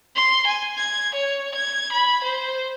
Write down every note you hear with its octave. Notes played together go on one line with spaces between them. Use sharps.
C6
G#5
G#6
C#5
G#6
B5
C5